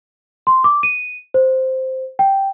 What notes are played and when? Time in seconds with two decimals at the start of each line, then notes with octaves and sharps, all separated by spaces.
0.47 C6
0.64 D6
0.83 D#7
1.34 C5
2.19 G5